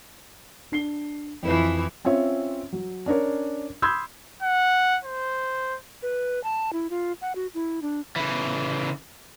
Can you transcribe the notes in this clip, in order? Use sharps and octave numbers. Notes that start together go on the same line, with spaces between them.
D4 C7 G7
F2 E3 F3 E4 B4
C4 C#4 F4 C#5 E5
F#3
C#4 D4 A#4 C#5
B5 C6 D#6 E6 G6 G#6
F#5
C5
B4
A5
E4
F4
F#5
F#4
E4
D4
C#3 E3